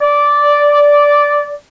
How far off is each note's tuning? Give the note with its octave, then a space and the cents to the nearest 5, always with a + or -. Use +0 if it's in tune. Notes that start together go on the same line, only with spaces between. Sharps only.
D5 -10